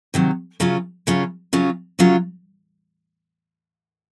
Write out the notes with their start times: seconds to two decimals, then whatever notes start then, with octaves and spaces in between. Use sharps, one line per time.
0.14 C3 D#3 F#3
0.60 C#3 F#3 C#4 F4
1.07 C#3 F#3 C#4 F4
1.53 C#3 F#3 C#4 F4
1.99 C#3 F#3 C#4 F4